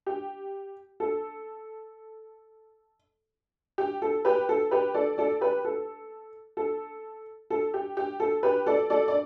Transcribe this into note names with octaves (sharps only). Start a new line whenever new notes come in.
G4
A4
G4
A4
G4 B4
A4
G4 B4
A4 D5
A4 D5
G4 B4
A4
A4
A4
G4
G4
A4
G4 B4
A4 D5
A4 D5
D5